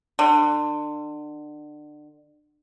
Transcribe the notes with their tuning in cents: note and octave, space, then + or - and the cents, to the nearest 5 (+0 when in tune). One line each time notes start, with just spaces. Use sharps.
D3 +30